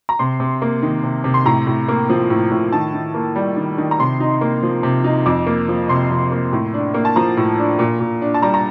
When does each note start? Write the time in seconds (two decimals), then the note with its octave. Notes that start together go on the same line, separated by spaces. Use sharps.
0.09 A#5
0.19 C3 C6
0.40 C3
0.62 A#3
0.82 D#3
1.04 C3
1.24 C3
1.34 C6
1.45 A2 A#5
1.67 A2
1.88 A#3
2.09 F3
2.30 A2
2.51 A2
2.72 D#3 A5
2.93 D#3
3.15 A#3
3.36 G3
3.57 D#3
3.78 D#3
3.91 A#5
3.99 C3 C6
4.20 D#4
4.41 A#3
4.63 F3
4.83 C3
5.04 D#4
5.26 F2 D6
5.46 A#3
5.69 F3
5.89 C3 C6
6.10 F2
6.31 A#3
6.53 A2
6.74 D4
6.94 A#3
7.05 A5
7.16 F3 A#5
7.37 A2
7.58 D4
7.79 A#2
8.00 A#2
8.22 D4
8.34 A5
8.42 G3 A#5
8.54 A#5